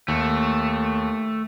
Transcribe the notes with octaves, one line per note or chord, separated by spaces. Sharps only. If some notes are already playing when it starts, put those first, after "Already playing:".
D#2 A3